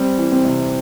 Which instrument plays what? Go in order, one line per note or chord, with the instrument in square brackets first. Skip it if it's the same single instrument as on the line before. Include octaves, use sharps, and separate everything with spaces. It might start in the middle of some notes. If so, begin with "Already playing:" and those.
Already playing: [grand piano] G3 [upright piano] C4
[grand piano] E3
[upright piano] C4
[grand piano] C3